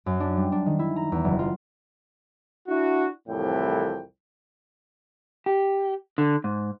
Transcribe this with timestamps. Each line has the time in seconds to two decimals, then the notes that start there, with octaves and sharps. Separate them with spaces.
0.06 F#2
0.20 D4
0.37 G3
0.52 D4
0.66 D#3
0.79 E4
0.96 A#5
1.12 E2
1.25 F#1
1.39 F4
2.68 D4 E4 F#4
3.28 C2 F2 A2 E3 G5
5.46 G4
6.18 D3
6.44 G#2